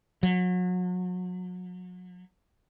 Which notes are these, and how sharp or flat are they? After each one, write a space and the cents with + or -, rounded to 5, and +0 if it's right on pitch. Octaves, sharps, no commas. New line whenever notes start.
F#3 -35